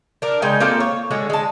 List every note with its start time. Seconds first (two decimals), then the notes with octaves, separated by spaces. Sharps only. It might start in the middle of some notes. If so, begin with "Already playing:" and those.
0.22 D4 A#4
0.42 C#3 G#3 D#4 G5
0.60 A#3 C4 F4 A4
0.80 C#5
1.11 D3 G#3 C#4 F#4
1.30 G#3 A5